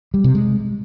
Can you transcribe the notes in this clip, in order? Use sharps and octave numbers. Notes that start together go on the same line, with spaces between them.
G3
C3
G#3